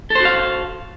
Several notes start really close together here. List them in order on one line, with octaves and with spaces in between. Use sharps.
A4 C5 F#4 F5